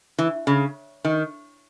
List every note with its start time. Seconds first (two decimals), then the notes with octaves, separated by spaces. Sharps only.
0.19 E3
0.47 C#3
1.05 D#3